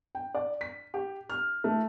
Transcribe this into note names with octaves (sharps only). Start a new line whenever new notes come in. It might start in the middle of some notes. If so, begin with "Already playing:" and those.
G5
D5
B6
G4
F6
A3